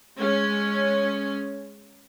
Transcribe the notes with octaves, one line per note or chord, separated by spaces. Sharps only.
G#3 C#4